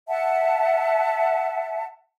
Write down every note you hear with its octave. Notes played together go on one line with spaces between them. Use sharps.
E5 F#5 A5